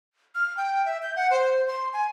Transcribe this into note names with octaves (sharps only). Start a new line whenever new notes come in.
F6
G5
E5
G6
F#5
C5
C6
G#5